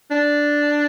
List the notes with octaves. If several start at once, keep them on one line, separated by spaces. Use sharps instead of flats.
D4